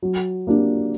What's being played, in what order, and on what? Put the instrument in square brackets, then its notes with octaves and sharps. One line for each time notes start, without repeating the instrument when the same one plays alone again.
[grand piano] F#3
A#3 D4 G4